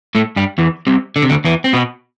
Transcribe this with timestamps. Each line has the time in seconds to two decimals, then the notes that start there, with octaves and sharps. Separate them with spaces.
0.15 A2 A3
0.36 G2 G3
0.58 E2 E3
0.87 C2 C3
1.16 D3
1.23 C3
1.29 D2 D3
1.45 E2 E3
1.64 C4
1.73 B2 B3